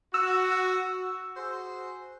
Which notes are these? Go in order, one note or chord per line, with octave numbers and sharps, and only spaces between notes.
F#4 E6
F#4 G#4 C5